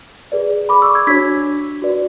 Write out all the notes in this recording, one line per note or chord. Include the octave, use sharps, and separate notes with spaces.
G#4 B4 D5
B5 D6
C#6 E6
E6 G#6
D4 F#4 C#5 G#6 B6
F#4 B4 D5